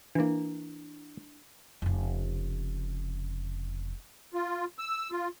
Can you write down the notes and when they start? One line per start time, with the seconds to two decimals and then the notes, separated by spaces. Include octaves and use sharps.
0.15 E3 A#3 D4 E4
1.82 F1 C#3
4.33 F4
4.79 E6
5.11 F4